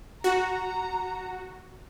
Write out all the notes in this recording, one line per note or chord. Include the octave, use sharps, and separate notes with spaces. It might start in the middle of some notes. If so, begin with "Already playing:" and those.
F#4 A#5